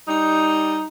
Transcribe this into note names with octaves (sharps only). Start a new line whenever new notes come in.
G3 D#4